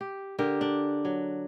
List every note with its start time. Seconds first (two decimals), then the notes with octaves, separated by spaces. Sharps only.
0.01 G4
0.39 D3 G4 A#4
0.61 D4
1.05 F#3